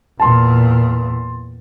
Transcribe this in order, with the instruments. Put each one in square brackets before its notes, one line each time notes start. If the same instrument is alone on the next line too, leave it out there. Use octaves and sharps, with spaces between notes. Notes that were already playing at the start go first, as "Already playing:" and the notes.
[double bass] E2 A#2 [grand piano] A5 C6